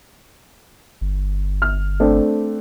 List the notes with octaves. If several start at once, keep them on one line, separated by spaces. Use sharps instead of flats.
G1
F6
A3 C4 D4